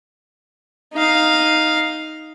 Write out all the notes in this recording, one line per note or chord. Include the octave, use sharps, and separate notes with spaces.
D#4 F5